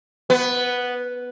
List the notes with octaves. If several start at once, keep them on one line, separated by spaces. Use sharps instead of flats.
B3